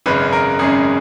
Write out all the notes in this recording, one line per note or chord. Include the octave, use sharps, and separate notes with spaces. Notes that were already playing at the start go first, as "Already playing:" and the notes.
G#1 F#2 C#3 G#3 B4
A#4
G#1 F#2 C#3 G#3 G#4